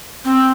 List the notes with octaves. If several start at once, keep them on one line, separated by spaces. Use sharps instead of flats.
C4